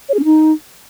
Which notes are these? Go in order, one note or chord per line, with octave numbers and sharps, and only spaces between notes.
C#5
G#4
C#4
D#4